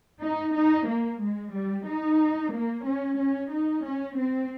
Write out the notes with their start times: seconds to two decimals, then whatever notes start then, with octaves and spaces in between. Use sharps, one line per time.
0.24 D#4
0.56 D#4
0.89 A#3
1.23 G#3
1.55 G3
1.87 D#4
2.53 A#3
2.86 C#4
3.19 C#4
3.52 D#4
3.86 C#4
4.19 C4